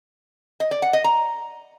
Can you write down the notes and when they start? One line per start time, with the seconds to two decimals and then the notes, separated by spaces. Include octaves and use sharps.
0.60 D#5
0.71 D5
0.82 F#5
0.93 D#5
1.04 A#5